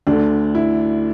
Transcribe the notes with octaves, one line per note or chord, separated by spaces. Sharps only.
D2 D3 D4
E4